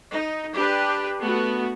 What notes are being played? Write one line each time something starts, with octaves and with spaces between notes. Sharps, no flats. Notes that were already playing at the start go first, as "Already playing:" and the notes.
D#4
D4 G4 B4
A3 B3 F#4